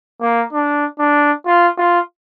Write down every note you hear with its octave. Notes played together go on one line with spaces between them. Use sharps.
A#3
D4
D4
F4
F4